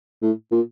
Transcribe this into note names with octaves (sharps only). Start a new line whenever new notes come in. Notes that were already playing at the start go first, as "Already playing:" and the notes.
A2
A#2